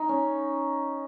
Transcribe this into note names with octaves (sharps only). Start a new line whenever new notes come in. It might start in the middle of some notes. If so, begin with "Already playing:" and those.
Already playing: D#4
C#4